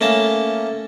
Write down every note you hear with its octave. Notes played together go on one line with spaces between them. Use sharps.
A3 A#3 C#4 A5